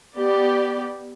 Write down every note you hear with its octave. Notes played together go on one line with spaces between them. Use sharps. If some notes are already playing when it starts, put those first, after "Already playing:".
B3 G4 D5